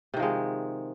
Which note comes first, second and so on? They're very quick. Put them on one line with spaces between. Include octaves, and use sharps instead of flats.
C3 D#3 F3 G#3